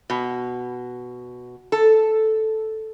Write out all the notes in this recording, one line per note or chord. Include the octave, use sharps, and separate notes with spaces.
B2
A4